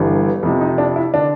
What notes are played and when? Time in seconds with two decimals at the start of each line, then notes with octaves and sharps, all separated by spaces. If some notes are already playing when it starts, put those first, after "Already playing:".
Already playing: G1 G2 E3 G3
0.43 F2 C3 F3
0.61 D#4
0.78 D4
0.96 E4
1.14 D3 D4